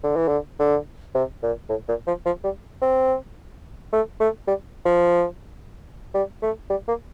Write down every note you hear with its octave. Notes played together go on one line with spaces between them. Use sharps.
D3
E3
D3
D3
C3
A#2
A2
A#2
F3
F3
G3
C4
A3
A3
G3
F3
G3
A3
G3
A#3